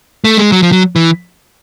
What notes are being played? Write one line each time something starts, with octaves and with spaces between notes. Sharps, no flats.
A3
G#3
F#3
F3
F#3
E3